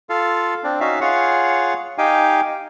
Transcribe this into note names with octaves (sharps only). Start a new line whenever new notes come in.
F4 A4 F5
C4 D4
C#4 D#4 F#4 E5 F5
F4 G#4 C#5 F5 F#5
D#4 G4 F5 G5 G#5